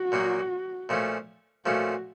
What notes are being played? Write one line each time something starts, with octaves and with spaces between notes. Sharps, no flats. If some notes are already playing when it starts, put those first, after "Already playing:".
Already playing: F#4
A#2 F#3 A#3 D#4
A#2 F3 A3 C#4
A#2 F3 A3 C#4 F#4